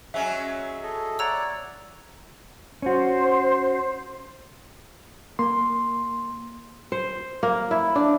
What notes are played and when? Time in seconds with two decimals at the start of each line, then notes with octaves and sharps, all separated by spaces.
0.14 F#3 G#3 C#4 E5
0.83 A4 D#5
1.19 C#5 D5 F#5 A#5 E6
2.82 C#4 F#4 C5
5.39 A#3 C6
6.92 C5
7.43 A#3
7.71 E4
7.96 D4